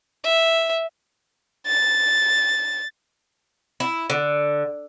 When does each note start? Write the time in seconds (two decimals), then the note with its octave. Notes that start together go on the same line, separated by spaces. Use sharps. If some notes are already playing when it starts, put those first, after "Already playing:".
0.24 E5
1.67 A6
3.80 E4
4.10 D3